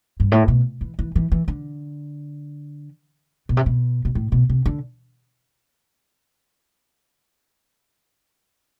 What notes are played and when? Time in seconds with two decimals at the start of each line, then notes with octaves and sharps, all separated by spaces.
0.20 G2
0.32 A2
0.48 B2
0.81 E3
0.99 E3
1.15 E3
1.32 E3
1.48 D3
3.49 B2
3.57 C3
3.66 B2
4.05 B2
4.15 A2
4.32 B2
4.50 C3
4.66 D3